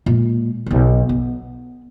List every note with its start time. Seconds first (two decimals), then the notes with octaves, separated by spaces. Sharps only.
0.06 A#2 G#3
0.66 E1 B1
1.09 B3